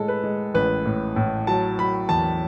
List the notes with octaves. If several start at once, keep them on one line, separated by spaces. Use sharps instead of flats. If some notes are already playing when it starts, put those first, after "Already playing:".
Already playing: A2 G#3 A4
B4
G#3
A1 B4
A2
A2
F#3 A5
F#3 B5
E2 A5